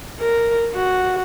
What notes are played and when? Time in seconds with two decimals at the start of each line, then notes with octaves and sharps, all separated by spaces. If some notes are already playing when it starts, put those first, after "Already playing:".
0.20 A#4
0.75 F#4